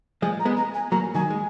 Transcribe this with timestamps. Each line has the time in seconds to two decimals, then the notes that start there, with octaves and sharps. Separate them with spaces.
0.22 F3 G#3 G#5
0.40 A#5
0.45 G#3 B3
0.57 A#5
0.74 G#5
0.92 F#3 A#3 A#5
1.14 D#3 F#3 G#5
1.30 G#3